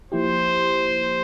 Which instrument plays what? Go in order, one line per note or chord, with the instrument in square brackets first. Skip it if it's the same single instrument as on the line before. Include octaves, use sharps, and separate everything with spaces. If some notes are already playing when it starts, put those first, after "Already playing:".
[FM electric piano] F3 A#3 E4 G4 [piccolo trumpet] C5